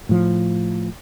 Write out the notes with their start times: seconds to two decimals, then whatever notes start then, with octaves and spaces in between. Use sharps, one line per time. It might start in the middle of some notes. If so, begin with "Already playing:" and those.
0.09 A2 F3